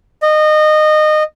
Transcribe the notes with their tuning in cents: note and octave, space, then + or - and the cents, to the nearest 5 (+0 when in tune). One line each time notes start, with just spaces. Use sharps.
D#5 -25